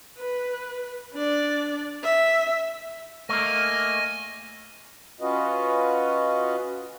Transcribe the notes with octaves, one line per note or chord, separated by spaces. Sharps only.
B4
D4 D5
E5
A3 A#3 D#5 G#5 F6
C#4 F4 F#4 B4 D#5